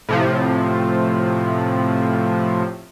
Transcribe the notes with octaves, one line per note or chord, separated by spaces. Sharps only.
A2 C3 F3